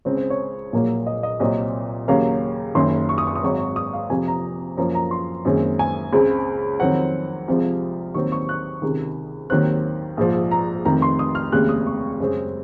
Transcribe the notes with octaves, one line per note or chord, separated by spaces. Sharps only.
C#2 C#3 G#3 C4 C#5
C5
C#5
A#1 A#2 F#3 A#3
D#5
D#5
C2 A#2 F#3 C4 D#5
D#2 C#3 F#3 A#3 F5
F#1 F#2 D#3 C6
C#6
D#6
C#6
D#6
G#1 G#2 F#3 C#6
D#6
F5
F2 C3 F3 G#5
A#5
F#2 F3 A#3 A#5
A#5
C6
F#1 F#2 D#3 G#3 C4
G#5
C#2 C#3 G#3 C4
F2 D#3 F#3 C4 F#5
C2 C3 F3 G#3
D#2 D#3 F#3 C4 C#6
C#6
F#6
C#2 C3 D#3
D#2 D#3 F#3 C4 F#6
A#1 G#2 F3
A#5
F1 F2 D#3 A#5
C6
D#6
F6
F1 D#2 C#3 G#3 F#6
D#6
C#6
F#2 C#3 G#3 C4